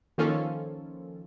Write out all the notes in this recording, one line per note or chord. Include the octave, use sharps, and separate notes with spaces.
D#3 F3 A#3 C#4 F4 A4